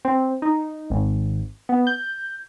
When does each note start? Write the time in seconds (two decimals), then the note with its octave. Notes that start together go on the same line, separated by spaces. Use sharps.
0.05 C4
0.42 D#4
0.90 G#1
1.69 B3
1.87 G6